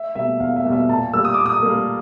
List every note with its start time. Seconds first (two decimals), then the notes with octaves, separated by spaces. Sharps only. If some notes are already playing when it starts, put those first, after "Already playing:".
Already playing: E5
0.15 B2 G3 A#3 E5
0.40 E2 F5
0.56 E5
0.64 B2 G3 A#3
0.72 E5
0.89 A#2 A5
1.13 G3 A#3 E6
1.25 D#6
1.34 A#2 D6
1.46 D#6
1.63 G3 A#3